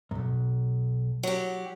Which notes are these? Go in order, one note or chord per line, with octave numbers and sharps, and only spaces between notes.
B1 F#2
F#3 G4